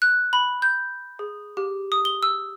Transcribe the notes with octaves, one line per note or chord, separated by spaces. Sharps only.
F#6
B5
G6
G#4
G4
D#6
G7
E6